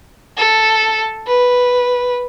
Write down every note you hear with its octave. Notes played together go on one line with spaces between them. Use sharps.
A4
B4